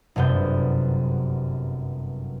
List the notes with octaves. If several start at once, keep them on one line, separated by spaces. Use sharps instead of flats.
G1 F#2 C3 B3 G6